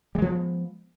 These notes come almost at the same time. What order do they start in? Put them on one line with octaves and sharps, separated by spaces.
G3 G#3 F3 B3